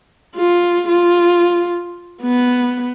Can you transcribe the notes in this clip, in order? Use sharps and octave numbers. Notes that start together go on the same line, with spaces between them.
F4
F4
B3